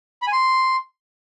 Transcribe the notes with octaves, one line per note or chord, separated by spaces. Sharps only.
B5
G#5
C6